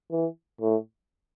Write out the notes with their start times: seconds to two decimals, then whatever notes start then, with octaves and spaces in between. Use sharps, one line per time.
0.11 E3
0.61 A2